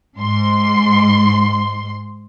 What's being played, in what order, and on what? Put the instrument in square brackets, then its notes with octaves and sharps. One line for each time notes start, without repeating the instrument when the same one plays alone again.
[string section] G#2 C6